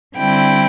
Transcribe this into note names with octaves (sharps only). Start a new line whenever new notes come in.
D3 G3 C4 E4 G5